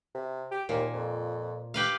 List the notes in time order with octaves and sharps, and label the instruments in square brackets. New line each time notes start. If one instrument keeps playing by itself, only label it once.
[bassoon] C3
G4
[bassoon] D#2 [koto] A#2
[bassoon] F2
[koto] G4 B4 F5